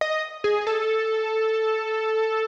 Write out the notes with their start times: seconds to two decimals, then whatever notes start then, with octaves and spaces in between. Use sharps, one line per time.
0.01 D#5
0.44 G#4
0.67 A4